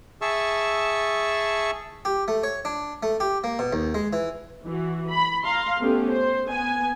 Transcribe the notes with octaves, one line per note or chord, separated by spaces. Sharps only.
G#4 E5 A5 C#6 E6
G4
A3
C#5
D4
A3
G4
A#3
B2
D#2
G#3
E3
E3 F#4
B5
F5 A#5 C6
A3 B3 C#4 G4 A4
C5
B3 G#5